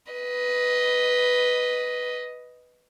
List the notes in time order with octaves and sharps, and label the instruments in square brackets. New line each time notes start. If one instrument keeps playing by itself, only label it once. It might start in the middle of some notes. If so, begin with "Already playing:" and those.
[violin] B4 D#5